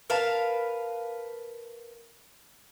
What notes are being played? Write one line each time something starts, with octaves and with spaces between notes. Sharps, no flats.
A#4 B4 F5 A5